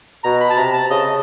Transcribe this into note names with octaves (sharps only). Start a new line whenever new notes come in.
B2 A#5
B5
A5
C3 A#5
A5
C#3 D#5